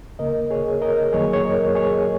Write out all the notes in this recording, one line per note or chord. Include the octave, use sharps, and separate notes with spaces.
D#2 C#3 A#3 A#4 D#5
G#4 C#5
A#4 D#5
F#2 D#3 F#3 A#3 G#4 C#5
C#5
A#4 D#5
G#4 C#5